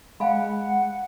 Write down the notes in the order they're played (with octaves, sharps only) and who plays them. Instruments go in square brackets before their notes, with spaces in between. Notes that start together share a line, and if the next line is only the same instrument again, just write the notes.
[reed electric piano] G#3 [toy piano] F5 G#5 B5 [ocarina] F#5